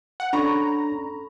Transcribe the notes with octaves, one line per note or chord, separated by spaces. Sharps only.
F#5
C#4 D4 A4 A#5 B5 C#6